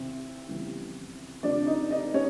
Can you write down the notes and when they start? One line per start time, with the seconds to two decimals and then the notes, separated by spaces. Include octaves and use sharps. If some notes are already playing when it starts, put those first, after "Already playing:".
Already playing: C2 C3 D#3 C4
0.48 F2 C#3 E3 G3 B3
1.43 F2 C#3 F3 D4 D5
1.67 D#4 D#5
1.91 D#4 D#5
2.14 C#4 C#5